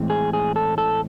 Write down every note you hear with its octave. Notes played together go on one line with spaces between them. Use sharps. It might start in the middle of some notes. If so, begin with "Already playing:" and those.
Already playing: A2 E3 G#3 C4
G#4
G#4
A4
A4